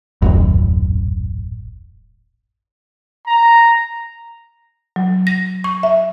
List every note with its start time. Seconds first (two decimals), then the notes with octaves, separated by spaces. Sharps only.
0.22 D#1 A1 F#2
3.27 A#5
4.96 F#3
5.27 A#6
5.64 C#6
5.83 E5